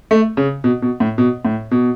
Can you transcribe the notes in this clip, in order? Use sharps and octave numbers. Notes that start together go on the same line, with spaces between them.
A3
C#3
B2
B2
A2
B2
A2
B2